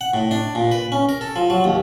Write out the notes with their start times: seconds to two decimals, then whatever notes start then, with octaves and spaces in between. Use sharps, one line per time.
0.01 F#5
0.14 A2
0.31 D4
0.55 A#2
0.72 B4
0.92 C#4
1.09 A#4
1.21 A4
1.36 F3
1.50 F#3
1.64 D#2